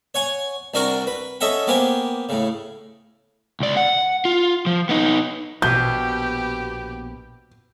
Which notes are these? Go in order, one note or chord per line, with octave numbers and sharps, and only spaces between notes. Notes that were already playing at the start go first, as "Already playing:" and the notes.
C#5 F#5 G#5
C2 D4 F#4 A#4 F#5
B4
C#4 A4 D#5 E5 F#5
A#3 B3 G4 C5 G#5
A2 C#3
C#2 D5
F#5
F4
F3
B3 D#4
A#1 B2 G4 B4 G6